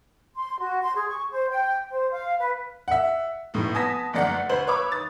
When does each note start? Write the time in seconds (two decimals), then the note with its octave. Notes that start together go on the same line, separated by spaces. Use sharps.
0.34 C6
0.60 F#4
0.82 C6
0.95 G#4
1.09 C#6
1.30 C5
1.50 G5
1.90 C5
2.11 F5
2.40 B4
2.88 E5 F#5
3.54 F1 A2
3.74 B3 G#5 A5 D#6 A#6 B6
4.13 G1 F#2 A3 D5 F#5 C#7
4.49 D2 B4 C5 F#7
4.67 B4 C#5 B5 C#6 D6 E6
4.92 D#6 A6